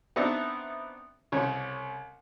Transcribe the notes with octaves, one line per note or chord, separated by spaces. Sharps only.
B3 C4 D4 D#4 E5
C2 C#3 C#5